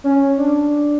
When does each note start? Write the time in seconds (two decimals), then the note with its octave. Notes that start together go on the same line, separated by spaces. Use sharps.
0.04 C#4
0.38 D4